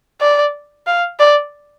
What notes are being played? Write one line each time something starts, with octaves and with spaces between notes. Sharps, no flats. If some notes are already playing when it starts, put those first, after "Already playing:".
D5
F5
D5